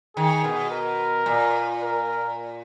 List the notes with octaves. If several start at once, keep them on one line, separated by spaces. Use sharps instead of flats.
D#3 G#4
B2
A#4
A#2
A#4